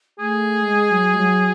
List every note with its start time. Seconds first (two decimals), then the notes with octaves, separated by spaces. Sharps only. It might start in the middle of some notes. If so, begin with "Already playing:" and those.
0.19 A3 G#4
0.62 G#3
0.91 F#3
1.14 G#3
1.19 F#3